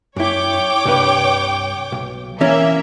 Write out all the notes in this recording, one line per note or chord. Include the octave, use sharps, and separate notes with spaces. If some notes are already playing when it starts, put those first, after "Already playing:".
F#2 E4 C#5 G5 D6
C2 G2 B4
B1
E3 A#3 C#4 E5